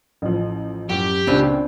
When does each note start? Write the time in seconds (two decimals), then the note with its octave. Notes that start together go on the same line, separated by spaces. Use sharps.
0.22 A1 F3
0.89 F#2 G4
1.27 C#2 A#2 C4 D4 B4